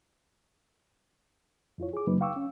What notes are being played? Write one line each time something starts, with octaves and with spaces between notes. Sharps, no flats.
F2 E4 F4 C#5
G#4 D6
F#2 C#3 F#3 A#3 D#4 B4
F5 G5 C#6 D6 E6
C#4